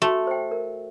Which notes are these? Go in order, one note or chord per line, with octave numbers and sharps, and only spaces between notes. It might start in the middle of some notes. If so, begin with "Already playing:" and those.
A3 F#4
C5 G5
A#4